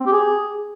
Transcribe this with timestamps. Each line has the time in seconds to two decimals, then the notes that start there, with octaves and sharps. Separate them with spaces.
0.01 C4
0.07 G4
0.12 G#4